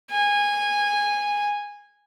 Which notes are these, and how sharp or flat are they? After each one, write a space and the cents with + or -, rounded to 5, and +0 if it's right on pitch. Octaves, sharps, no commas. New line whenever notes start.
G#5 -15